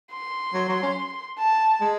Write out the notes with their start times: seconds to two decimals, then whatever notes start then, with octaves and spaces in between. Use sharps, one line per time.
0.12 C6
0.54 F#3
0.68 F#3
0.82 C#4
1.38 A5
1.81 G#3